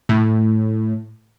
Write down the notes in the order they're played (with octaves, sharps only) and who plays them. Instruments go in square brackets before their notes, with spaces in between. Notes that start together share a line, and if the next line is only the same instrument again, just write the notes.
[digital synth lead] A2